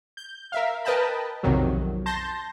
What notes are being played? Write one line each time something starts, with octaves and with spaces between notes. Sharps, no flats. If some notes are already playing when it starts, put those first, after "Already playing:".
G6
A#4 E5 F5
A#4 B4 D#5 G5 A5 B5
B1 F2 C3 D#3 F#3
A5 C6 G6 A#6